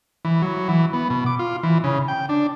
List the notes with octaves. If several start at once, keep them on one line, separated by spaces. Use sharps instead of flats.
E3
F#3
E3
B3
B2
D6
F4
E3
C#3
G5
D4